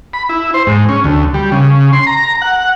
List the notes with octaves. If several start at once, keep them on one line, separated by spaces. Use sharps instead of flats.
B5
E4
C5
G#2
C#4
D2
G3
C#3
C6
A#5
F#5